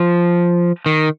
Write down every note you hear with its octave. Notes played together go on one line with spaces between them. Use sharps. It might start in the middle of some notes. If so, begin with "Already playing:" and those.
Already playing: F3
D#3